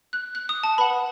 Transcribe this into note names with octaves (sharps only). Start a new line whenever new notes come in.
F#6
F#6
D#6
A5
B4 F#5 B5